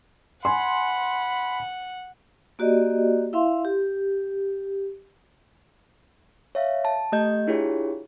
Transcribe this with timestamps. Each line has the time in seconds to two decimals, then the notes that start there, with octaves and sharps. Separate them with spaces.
0.45 F#5 G#5 B5 C6
2.59 A#3 F#4 G4 D5 D#5
3.33 E4 E5 F5 C6
3.65 G4
6.55 C#5 E5 F5
6.85 A5
7.12 A3 G4 D#5 G6
7.47 D4 E4 F4 G4 G#4 C#5